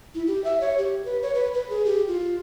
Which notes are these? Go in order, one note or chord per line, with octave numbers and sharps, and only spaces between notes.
E4
G4
E5
C#5
G4
B4
C#5
B4
B4
G#4
G4
F4